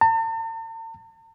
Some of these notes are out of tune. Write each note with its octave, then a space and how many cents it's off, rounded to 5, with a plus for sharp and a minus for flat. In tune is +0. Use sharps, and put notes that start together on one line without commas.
A5 +45